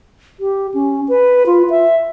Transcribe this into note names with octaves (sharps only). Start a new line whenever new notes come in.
G4
C#4
B4
F4
E5